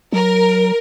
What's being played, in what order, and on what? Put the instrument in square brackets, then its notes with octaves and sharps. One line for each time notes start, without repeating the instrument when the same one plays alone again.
[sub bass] F#3 [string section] A#4